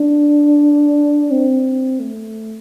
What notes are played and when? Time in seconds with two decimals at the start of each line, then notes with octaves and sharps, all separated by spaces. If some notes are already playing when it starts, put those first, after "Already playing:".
Already playing: D4
1.31 C4
2.00 A3